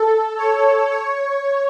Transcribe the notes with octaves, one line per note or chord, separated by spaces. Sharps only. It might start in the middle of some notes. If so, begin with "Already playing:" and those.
Already playing: A4
C#5
C#5